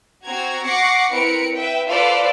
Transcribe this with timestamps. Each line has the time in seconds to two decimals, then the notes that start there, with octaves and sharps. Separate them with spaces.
0.24 C4 F#4 A#5 G#6
0.65 F#5 C#6 D6 A#6 C7 C#7
1.12 C4 E4 A#4 B4 C#7 D7
1.56 B4 E5 G5
1.88 F4 A4 B4 C5 D5